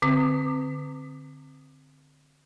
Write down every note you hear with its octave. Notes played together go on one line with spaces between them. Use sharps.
D3 C4 D#6